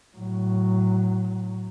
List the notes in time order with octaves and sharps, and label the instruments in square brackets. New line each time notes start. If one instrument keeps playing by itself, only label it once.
[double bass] A2 F#3